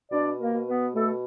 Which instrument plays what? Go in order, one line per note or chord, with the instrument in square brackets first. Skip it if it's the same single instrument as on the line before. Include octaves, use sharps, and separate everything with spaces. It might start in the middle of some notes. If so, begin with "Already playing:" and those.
[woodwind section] B2 D4 D5
A#3 A#4
B2
B3 B4
B2 A3 A4